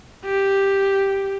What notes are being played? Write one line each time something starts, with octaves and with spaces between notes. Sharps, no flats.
G4